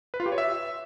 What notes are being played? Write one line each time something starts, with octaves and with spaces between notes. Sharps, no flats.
B4
F4
G4
C#5
E5